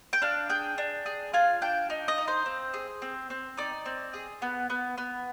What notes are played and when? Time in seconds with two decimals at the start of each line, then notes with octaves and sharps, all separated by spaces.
0.13 G5
0.22 D4 F5
0.49 G#4 G5
0.78 D4
1.06 G#4
1.33 F4 G#5
1.62 D4 G5
1.90 D#4
2.08 D#5
2.18 D#4
2.28 C5
2.46 C4
2.74 G#4
3.02 C4
3.30 C4
3.57 D#4 D5
3.86 C4
4.13 G#4
4.42 B3
4.70 B3
4.98 B3